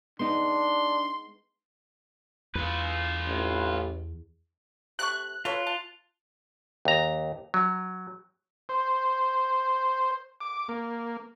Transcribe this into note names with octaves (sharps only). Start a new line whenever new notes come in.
G#3 B3 D4 D#4 C6
E2 F4 B4
A1
C3 A3 C#6 F#6
F4 A4 B4 C#5
A5
D#2 A#5
F#3
C5
D6
A#3